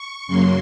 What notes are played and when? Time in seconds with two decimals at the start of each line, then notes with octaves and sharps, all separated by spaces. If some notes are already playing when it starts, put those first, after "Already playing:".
Already playing: C#6
0.27 F#2 C#3 F#3 A#3 C6